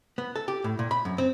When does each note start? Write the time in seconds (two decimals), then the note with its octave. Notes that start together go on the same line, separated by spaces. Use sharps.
0.18 B3
0.36 A4
0.48 G4
0.64 A2
0.79 A#2
0.91 B5
1.05 F#2
1.18 C4